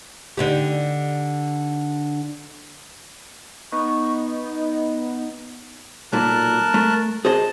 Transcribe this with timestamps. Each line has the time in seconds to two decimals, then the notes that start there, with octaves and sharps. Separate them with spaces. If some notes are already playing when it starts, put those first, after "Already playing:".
0.37 D3 D#4 G4
3.72 B3 D#4 C#6
4.25 D#5
6.13 B1 A#2 A#4 A5 F#6
6.74 A3
7.25 G#4 C5 D#5 A5